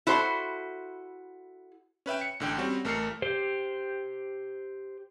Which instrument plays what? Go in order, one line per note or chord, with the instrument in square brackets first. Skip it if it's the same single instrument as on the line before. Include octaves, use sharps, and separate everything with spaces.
[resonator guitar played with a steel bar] E4 F#4 A4 C5
[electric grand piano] C#4 B4 E5 G5
C#7
A1 D3 G5
G3 C4 C#4 F#4
A1 A3 A#4 F6 C7 C#7
[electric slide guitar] G4 C5